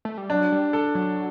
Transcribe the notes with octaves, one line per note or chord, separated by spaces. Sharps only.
A3
G3
F#3 D4
G3
A4
F#3